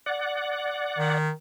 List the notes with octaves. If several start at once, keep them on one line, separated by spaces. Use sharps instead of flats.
D5 F#5
D#3